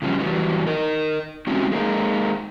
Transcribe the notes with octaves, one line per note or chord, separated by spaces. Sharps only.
C#3 F3 G3 C4 C#4
E2 E3 F#3 G3
A#4 D#5
G#3 C4 C#4 E4 F#4 G4
G#3 A#3 D#4